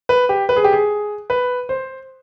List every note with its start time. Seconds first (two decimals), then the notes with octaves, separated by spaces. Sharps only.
0.09 B4
0.29 G4
0.49 B4
0.56 G#4
0.64 G4
0.73 G#4
1.30 B4
1.69 C5